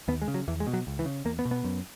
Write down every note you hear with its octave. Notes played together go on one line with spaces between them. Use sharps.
D#2 B3
G#3
C#3
F#3
E2 E3
G#3
B2
F#3
C#2
E3
C#3
E2 A#3
B3
B2
B3
F#2